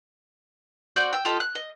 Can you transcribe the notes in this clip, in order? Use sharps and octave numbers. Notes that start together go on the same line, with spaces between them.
C4 F#4 D5 G6
G5 E6
F4 G4 A4 D#5
F#6
D#5